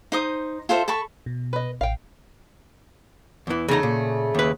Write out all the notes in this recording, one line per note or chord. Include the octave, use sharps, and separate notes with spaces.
D#4 C5 D#6
F4 A4 C5 E5
A4 A5 B5 C#6
B2
B4 D#5
A1 F5 G5
E2 E3
E2 C#3 A3 D#4 A#5
A#2
D#2 B4